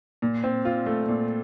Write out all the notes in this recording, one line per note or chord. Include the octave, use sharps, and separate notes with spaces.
A#2
C4
F4
A3
A#2